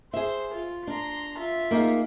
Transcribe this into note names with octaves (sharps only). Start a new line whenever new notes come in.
G#4 C5 E5
F4
D4 A#5 C6
F4 E5
A#3 D#4 G#4